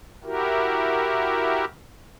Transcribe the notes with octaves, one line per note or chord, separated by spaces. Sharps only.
E4 F#4 G4 A#4